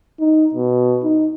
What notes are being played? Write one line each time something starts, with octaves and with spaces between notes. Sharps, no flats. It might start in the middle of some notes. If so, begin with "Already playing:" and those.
D#4
B2
D#4